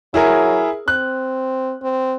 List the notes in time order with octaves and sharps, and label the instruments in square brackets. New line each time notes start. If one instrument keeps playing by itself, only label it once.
[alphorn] F#3 [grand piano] E4 G#4 A#4
[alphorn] C4 [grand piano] F#6
[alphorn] C4